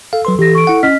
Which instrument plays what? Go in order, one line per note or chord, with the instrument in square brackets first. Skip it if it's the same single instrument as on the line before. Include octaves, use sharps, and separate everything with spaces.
[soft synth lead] A4 [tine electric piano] F5
[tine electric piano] F#3 B4 C6
[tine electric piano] E3 [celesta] G4 A#6
[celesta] C#6 D7
[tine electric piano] E4 F#5
[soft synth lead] C#4 [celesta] D#5 F6 B6